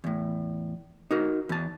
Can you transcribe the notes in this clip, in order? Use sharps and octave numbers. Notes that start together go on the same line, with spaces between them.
E2 A2
D#4 F#4 A#4
E2 A5